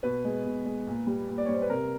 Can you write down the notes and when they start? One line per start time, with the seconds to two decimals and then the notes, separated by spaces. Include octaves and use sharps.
0.03 B2 B4
0.24 G#3
0.45 B2
0.65 G#3
0.87 A#2
1.07 G3
1.28 A#2
1.38 D5
1.45 G3 C#5
1.54 C5
1.62 B4
1.70 C3 A#4